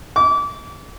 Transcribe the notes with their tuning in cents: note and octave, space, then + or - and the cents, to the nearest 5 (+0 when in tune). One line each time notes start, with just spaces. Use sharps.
D6 -30